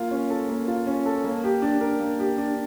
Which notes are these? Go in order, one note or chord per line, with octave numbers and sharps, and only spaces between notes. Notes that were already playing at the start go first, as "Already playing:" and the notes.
Already playing: A#3 F4
C#4
A4
A#3
F4
C#4
A4
A#3
G4
D4
A#4
A#3
G4
D4